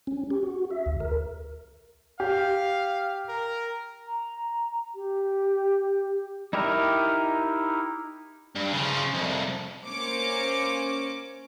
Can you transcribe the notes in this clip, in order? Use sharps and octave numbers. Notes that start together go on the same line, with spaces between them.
C#4
G4
F#4
E5
D2
A#4
G4 F5
A#4
A#5
G4
D#4 E4 G4 A#4
G2
C#3 F3
C2 F2
A#3 C#4 C5 D6 C#7